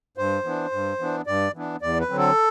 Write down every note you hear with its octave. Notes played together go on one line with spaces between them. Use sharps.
G2 C5
E3 B3 D4
G2
E3 B3 D4
G2 D5
E3 B3 D4
E2 D5
B4
D3 F#3 C4
A4